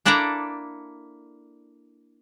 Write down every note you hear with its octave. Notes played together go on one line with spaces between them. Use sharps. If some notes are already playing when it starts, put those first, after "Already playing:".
A#3 D4 E4 A4 D5 A#5